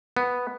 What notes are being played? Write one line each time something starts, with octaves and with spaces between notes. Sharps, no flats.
B3